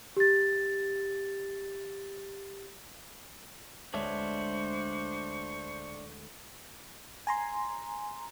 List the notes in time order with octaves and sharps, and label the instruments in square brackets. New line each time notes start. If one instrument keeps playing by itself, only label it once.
[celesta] G4 A6
[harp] D2 G#3 G#4 [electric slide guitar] D4 C#5 E5 [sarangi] C5 [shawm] C#6
[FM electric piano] G#5 A#5 C6